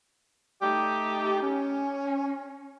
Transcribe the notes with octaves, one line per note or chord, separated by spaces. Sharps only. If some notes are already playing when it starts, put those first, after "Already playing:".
A3 D#4 G4
C#4